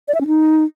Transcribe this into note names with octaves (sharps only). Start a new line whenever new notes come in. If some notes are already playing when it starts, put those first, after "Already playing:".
D5
E5
C#4
D#4